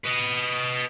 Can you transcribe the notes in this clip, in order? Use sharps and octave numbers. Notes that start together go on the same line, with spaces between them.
B4 D#5